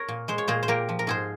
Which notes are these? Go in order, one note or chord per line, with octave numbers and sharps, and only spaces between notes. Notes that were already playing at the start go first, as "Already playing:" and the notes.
Already playing: A#4 C#5
A#2
G#3 C5
C#5
A#2 G#4 C5
C5
A#2 G4 A#4
F3
A#4
G#2 G#4 C5